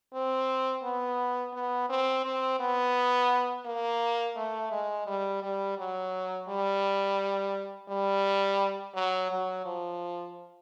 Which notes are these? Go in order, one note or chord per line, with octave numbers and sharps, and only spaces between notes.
C4
B3
B3
C4
C4
B3
A#3
A3
G#3
G3
G3
F#3
G3
G3
F#3
F#3
F3